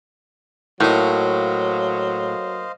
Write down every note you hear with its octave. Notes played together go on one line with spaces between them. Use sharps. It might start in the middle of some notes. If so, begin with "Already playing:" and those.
A2 F#3 A#3 D#4 C5 D#5 F5